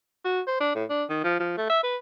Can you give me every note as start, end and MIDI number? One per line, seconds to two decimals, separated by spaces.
0.24 0.40 66
0.47 0.55 72
0.60 0.70 62
0.75 0.84 45
0.90 1.04 62
1.09 1.21 51
1.24 1.36 53
1.39 1.53 53
1.58 1.70 57
1.70 1.82 76
1.83 1.97 71